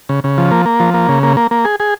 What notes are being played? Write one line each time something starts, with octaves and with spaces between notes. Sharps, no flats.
C#3
C#3
F3
A#3
A#3
F3
A#3
C#3
A#3
A#3
A#3
G#4
G#4